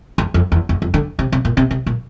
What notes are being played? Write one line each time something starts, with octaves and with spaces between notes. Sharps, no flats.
E2
F2
E2
E2
F2
D3
C3
C3
A#2
C3
C3
A#2